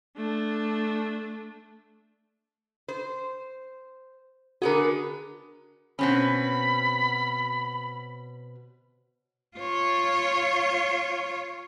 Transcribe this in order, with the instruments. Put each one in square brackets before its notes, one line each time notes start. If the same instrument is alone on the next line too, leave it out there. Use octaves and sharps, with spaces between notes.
[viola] A3 D4
[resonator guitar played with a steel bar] C5
[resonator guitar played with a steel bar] D3 B3 G#4 [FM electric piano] F#4 A#4
[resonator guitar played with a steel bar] B2 C4 C#4 [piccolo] B5
[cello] F4 C#5